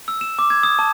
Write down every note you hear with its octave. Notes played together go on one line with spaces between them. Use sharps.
E6
E7
D6
G#6
D#6
A5